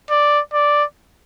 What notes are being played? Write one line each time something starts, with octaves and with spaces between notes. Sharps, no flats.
D5
D5